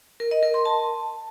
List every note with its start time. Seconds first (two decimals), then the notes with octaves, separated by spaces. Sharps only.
0.20 A#4
0.31 D#5
0.43 A#4
0.54 C6
0.65 A5